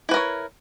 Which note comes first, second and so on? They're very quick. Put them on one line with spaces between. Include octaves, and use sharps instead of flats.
E4 B4 A#4 C#5